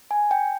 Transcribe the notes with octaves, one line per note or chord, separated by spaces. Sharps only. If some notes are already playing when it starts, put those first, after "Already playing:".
G#5
G5